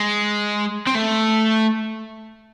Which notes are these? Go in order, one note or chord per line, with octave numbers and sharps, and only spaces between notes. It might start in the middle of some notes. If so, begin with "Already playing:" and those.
Already playing: G#3
C4
A3